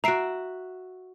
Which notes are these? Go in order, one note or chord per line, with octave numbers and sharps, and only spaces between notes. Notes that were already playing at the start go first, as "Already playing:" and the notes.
F#4 E5 A#5 C7 D7